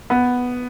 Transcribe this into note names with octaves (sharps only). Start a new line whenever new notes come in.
B3